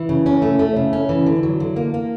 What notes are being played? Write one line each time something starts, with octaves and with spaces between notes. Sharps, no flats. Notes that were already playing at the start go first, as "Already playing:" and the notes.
Already playing: E3
C#3
C#4
A3
A3
C#3
C#4
E3
D3
F#3
D3
A#3
A#3